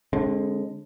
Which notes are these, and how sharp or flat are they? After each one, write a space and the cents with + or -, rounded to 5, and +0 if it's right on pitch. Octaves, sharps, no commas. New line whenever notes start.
D3 +0 G#3 +0 C4 +45